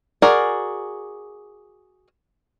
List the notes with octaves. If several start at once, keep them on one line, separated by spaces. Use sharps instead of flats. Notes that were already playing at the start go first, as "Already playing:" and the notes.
F#4 G#4 A#4 D5